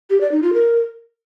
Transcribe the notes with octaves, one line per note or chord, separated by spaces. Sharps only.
G4
D5
D#4
F4
A#4